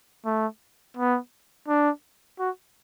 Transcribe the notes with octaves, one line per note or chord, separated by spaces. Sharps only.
A3
B3
D4
F#4